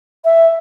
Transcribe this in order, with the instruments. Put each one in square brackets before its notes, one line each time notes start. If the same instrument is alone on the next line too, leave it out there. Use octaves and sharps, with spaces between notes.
[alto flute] E5